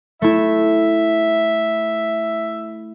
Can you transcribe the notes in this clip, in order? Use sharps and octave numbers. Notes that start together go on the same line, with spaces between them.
A3 E4 E5